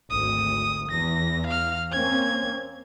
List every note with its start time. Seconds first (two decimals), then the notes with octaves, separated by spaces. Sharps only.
0.10 G#1 D2 D#6
0.91 E2 A#6
1.47 F5 F6
1.92 A#3 C4 C#4 G#6